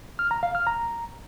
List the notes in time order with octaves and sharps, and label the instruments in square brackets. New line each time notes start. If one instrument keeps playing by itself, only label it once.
[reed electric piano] F6
A#5
F5
F6
A#5